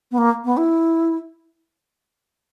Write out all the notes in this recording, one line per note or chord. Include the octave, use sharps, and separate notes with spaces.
B3
A#3
B3
E4